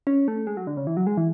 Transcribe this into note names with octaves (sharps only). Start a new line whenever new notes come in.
C#4
A3
G#3
F#3
D3
C#3
E3
F#3
G#3
E3